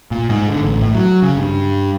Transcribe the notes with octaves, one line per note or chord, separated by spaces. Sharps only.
A#2
G#2
D3
A1
A2
F#3
C#3
G2